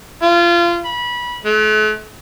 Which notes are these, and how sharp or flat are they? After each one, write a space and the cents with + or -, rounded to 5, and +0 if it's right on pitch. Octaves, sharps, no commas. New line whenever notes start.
F4 -25
B5 -25
A3 -45